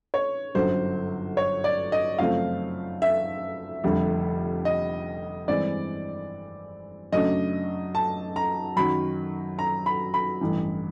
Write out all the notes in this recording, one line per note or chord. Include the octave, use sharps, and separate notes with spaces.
C#5
G1 F#2 D3 F#3 C5
C#5
D5
D#5
F#2 C#3 F3 A3 C4 F5
E5
F1 F2 D3 G3
D#5
G2 E3 G#3 C4 D5
F#2 C#3 F#3 A3 D4 D#5
A5
A#5
F#2 D#3 F#3 B5
A#5
B5
B5
A1 G2 E3